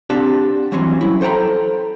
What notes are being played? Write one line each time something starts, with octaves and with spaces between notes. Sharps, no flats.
C4 D4 G4 D5 F#5 A5
E3 F#3 G3 C4 C#4
F#3 E4
A4 C5 G5 A#5 B5